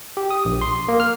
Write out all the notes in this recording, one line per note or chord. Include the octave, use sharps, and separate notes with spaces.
G4
D#6
A#1
C6
A#3
F6